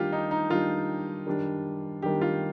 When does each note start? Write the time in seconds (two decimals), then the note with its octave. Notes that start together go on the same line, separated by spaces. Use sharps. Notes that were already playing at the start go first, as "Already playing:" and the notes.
Already playing: D#3 G3 D4 F4 G4
0.12 D#4
0.31 D#4
0.50 D#3 G3 D4 F4
1.27 D#3 G3 D4
2.02 D#3 G3 D4 G4
2.21 F4